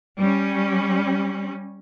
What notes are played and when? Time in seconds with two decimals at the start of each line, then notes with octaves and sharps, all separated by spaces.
0.19 G3 C#4